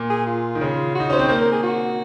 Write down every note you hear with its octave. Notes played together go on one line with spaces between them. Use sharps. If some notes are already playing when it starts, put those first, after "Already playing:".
Already playing: A#2
G#4
F4
D#3
C#3
F#4
D#4
C#4 C5
C4
A#3 C5
A#4
G#4
F#4